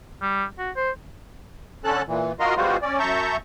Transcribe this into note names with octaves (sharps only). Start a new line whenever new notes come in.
G3
F#4
C5
D3 C#4 A4 A5 F#6
A#2 E3
F4 F#4 A#4 D#5 A#5 C6
G3 G#3 B3 F4 F#4 C5
C#4 D5
F#2 E5 A5 A#5 C#6 G6